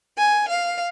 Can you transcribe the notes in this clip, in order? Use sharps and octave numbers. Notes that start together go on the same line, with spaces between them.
G#5
F5